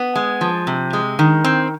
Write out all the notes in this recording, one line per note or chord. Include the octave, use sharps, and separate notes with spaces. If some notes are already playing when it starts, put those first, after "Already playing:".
Already playing: B3
G#3
F3
C3
G#3
D#3
C4